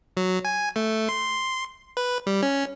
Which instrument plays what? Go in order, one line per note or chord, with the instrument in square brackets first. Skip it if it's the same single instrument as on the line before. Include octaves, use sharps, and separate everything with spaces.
[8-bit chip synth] F#3
G#5
A3
C6
B4
G3
C#4